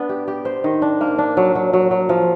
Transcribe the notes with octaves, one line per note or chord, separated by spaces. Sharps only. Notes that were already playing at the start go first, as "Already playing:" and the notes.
Already playing: B3 D4
G4
G4
C5
D#3
D4
A#3
D4
F#3
F#3
F#3
F#3
F3